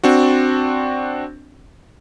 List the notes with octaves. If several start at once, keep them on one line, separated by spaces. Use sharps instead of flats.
C4 D4 F#4